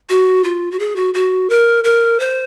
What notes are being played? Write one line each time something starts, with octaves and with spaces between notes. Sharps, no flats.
F#4
F4
F#4
G#4
F#4
F#4
A#4
A#4
C5